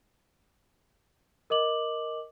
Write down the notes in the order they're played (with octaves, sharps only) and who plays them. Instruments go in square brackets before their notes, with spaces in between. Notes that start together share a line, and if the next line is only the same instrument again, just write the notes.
[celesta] A#4 D#5 D6 F#7